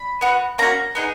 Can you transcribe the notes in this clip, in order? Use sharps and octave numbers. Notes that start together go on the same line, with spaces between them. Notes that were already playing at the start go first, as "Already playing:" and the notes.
Already playing: B5
B3 F#4
A#3 C#4 F#4 A#5
B3 D#4 G#4